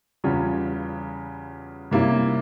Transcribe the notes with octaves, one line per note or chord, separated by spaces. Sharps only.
E2 C#3 G3 C#4 F4
C3 G3 A#3 C#4 E4